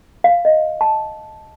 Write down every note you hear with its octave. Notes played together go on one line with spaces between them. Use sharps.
F5
D#5
A5